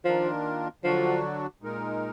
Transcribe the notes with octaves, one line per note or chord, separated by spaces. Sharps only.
D#3 F3 A#3 D4 F4 A#4
D3 F3 F#3 D4 F#4
A#2 G#3 D#4 A#4